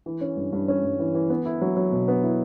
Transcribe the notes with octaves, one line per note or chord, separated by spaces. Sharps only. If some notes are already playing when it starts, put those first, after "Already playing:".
E3
C#4
G2
G2
C#4
G2
E3
E3
B3
E4
F#3
F#3
B2
B3
E4